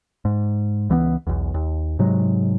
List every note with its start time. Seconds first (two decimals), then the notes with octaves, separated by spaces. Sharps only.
0.25 G#2
0.89 C#2 E3 A3 B3
1.27 B1 E2
1.54 D#2
1.99 G#2 C3 F#3 G#3